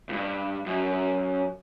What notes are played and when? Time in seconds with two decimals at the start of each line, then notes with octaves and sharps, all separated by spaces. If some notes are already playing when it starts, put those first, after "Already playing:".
0.09 C#2 G2
0.66 F#2